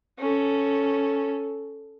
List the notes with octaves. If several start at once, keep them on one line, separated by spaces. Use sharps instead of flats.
C#4 A4